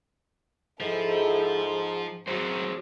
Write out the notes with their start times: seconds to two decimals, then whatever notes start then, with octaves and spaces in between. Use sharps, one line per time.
0.80 G#2 F3 E4 A4
2.28 F#2 F#4 G#4 C5 C#5